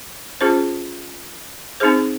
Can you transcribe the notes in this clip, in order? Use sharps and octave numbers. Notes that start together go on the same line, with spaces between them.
C#4 F4 G#4 C5
C4 D#4 G#4 C5